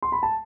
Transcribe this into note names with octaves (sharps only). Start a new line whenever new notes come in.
C6
B5
A5